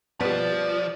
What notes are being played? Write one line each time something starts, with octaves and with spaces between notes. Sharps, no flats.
B2 F3 G3 B4 D5